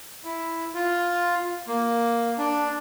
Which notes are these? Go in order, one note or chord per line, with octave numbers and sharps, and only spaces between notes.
E4
F4
A#3
D4